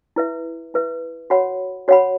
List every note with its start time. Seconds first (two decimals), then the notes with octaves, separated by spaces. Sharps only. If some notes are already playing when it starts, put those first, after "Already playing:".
0.16 E4 B4 E5
0.74 E4 B4 E5
1.30 F#4 C#5 F#5 B5
1.88 F#4 C#5 F#5 B5